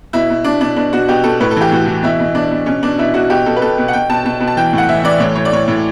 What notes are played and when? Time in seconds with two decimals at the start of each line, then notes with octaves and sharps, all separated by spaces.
0.13 B2 E4
0.30 B2
0.44 B2 D4
0.61 B2 D4
0.76 B2 D4
0.93 B2 F#4
1.08 B2 G4
1.24 B2 A4
1.40 A2 B4
1.51 A4
1.56 E3 G4
1.71 A2 F#4
1.87 E3
2.03 B2 E4
2.20 B2
2.35 B2 D4
2.51 B2
2.66 B2 C#4
2.83 B2 D4
2.99 B2 E4
3.14 B2 F#4
3.30 B2 G4
3.46 B2 A4
3.56 B4
3.61 B2 A4
3.78 B2
3.88 F#5
3.93 B2 G5
4.10 B2 A5
4.25 B2 A5
4.40 B2
4.47 A5
4.57 E3 G5
4.73 A2
4.78 F#5
4.89 E3 E5
5.04 E3 D5
5.20 A2 C#5
5.35 A2 C#5
5.45 D5
5.52 A2 C#5
5.68 A2